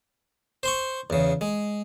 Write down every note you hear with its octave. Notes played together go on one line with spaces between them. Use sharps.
C5 C6 C#6
E2 C#3
G#3